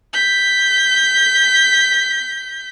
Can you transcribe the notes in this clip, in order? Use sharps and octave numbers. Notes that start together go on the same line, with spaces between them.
G6 B6